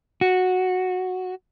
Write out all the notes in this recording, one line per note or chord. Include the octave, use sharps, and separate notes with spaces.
F#4